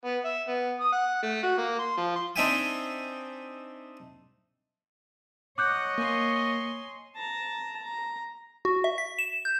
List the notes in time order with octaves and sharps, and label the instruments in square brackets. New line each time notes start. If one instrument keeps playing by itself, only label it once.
[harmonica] B3
E5
B3
D#6
F#5
A3
F#4
A#3
C6
F3
C6
[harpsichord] C4 D4 D#4 E5 G5 G#5
[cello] C#5 D#5 [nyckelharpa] F#5 [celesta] D6 F#6 G6
[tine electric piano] A#3 [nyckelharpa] G#5 C6
[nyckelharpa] A5 A#5
A#5
[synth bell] F#4
E5
B6
E7
G6